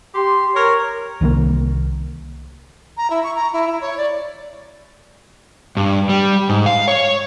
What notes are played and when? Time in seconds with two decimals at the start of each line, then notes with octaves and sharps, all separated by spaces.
0.15 G4 C6
0.55 A#4 C#5
1.21 C2 D#3 E3 A#3
2.97 A#5
3.10 E4
3.24 C#6
3.35 A#5
3.53 E4
3.68 E4
3.81 C#5
3.98 D5
5.77 G2
6.09 G3
6.49 G#2
6.66 F5
6.88 C#5